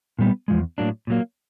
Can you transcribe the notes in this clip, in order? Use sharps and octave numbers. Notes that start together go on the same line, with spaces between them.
A#2 G3 B3
E2 C#3 F3 G#3
A2 F#3 A#3 D4
A#2 F#3 A#3